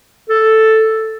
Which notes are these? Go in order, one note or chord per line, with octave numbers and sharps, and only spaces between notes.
A4